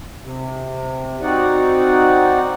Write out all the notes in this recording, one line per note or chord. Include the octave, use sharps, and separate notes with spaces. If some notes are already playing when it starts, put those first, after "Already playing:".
C3
C4 D#4 F#4 D5 F#5